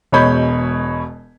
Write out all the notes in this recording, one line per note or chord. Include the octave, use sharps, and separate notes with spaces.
E1 B2 G#3 C#5 B5 G6